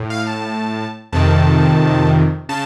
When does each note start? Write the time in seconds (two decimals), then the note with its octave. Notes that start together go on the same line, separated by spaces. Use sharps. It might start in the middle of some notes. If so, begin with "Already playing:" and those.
Already playing: A2
0.10 F5
0.27 A5
1.13 F2 C3 D#3 A5
2.49 C#3 A5